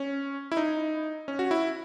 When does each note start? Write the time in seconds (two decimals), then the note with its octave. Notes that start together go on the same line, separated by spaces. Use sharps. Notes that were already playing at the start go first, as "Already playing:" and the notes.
Already playing: C#4
0.52 E4
0.57 D#4
1.28 C#4
1.39 F#4
1.51 E4